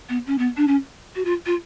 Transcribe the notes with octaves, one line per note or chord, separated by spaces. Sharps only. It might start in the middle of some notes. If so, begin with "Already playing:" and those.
B3
C#4
B3
D4
C#4
F#4
F4
F4